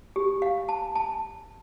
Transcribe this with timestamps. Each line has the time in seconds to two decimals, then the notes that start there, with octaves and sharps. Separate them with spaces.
0.16 G4
0.42 F5
0.69 A5
0.95 A5